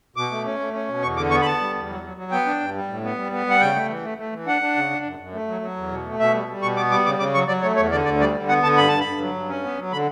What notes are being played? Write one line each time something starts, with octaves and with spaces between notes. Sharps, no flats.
B2 D6
A3
C#4
A3
C#4
B2
E2 C#6
D3 D6
B3 C#6
B5
B3 A5
G3
E2
F#3
F#3
F#3
B3 G5
D4
G2
G3
A2
B3
G3
B3
G3 F#5
C#3 G5
A3
E3
A3
A3
E3
D4 F#5
D4
C#3
D4
F#2
F#2
A3
F#3
F#3
E2
B2
A3
B2 E5
G3
G3
B2 C#6
B3 D6
G3 D6
C#3 D6
C#3 D6
F#3 C#6
F#3 D5
A3 C#5
E2 C#5
D3 D5
D2 D5
G3 D5
D3
B3 F#5
D3 A5
G2 B5
G2 A5
B5
G2
F#3
G2
C#4
B3
F#3
D3 B5